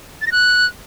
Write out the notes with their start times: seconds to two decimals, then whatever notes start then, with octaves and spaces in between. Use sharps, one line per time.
0.22 A6
0.27 A#6
0.32 F#6